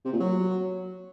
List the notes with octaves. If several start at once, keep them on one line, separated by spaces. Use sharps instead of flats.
C3
A#2
F#3